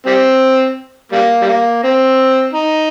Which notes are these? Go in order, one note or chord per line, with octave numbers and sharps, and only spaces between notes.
G3 C4
G3 A#3
G3
A#3
C4
D#4